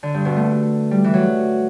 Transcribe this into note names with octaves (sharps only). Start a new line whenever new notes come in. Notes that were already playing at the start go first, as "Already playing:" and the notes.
D3
G2
B2
A3
G3
E3
F#3